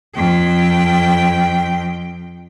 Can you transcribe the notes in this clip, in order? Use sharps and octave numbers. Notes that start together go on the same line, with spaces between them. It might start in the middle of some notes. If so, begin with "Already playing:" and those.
F2 G5